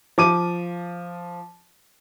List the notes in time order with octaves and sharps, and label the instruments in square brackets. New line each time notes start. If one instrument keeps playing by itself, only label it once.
[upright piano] F3 D6 D#7